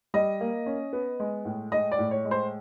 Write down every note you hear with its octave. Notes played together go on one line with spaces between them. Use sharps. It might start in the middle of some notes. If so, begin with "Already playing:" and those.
G3 D#5
A#3
C#4
B3
G#3
A2
G#3 D#5
D5
A2
C#5
G#3
C5